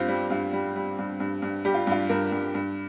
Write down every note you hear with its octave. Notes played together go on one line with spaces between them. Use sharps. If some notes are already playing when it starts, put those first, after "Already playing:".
Already playing: G2 C4 F4 G4
G3
G2 F4
G3
G3
G2
G2
G2
G3 G4
F4
G2 F4
G2 A#4
G2
G2